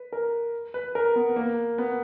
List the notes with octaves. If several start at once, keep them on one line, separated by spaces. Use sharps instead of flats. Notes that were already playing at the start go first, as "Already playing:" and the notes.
Already playing: B4
A#4
B4
A#4
B3
A#3
B3